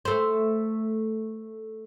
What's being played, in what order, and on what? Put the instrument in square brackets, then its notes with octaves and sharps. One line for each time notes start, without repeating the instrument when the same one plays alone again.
[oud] A3 C5